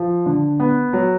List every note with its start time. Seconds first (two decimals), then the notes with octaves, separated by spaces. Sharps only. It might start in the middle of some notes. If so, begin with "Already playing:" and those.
Already playing: F3
0.26 D3
0.60 B3
0.93 F#3